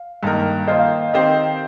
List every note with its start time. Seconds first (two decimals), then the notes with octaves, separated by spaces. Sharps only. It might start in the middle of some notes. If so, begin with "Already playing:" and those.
Already playing: F5
0.23 G2 D#3 A#3 D#4 A#4
0.67 D#3 A#3 F4 C5 D#5
0.79 F5
1.02 F5
1.13 D#3 C4 G4 C5 D#5